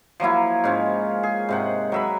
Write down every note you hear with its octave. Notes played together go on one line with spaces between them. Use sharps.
F3 F#3 A#3 E4
G#2 C#4 F4
G#4
G#2 C3 F#5
F#3 E5 B5